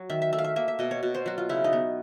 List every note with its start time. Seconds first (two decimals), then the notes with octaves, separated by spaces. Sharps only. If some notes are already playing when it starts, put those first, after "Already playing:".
Already playing: F#3
0.10 D#3 E5
0.22 E5
0.33 A3 E5
0.39 F5
0.44 E5
0.56 A#3 E5
0.68 E5
0.79 B2 D#5
0.91 C#5
1.03 B2
1.15 C5
1.26 F#3 F#4
1.38 F4
1.49 C#3 E4
1.64 D#4
1.73 B3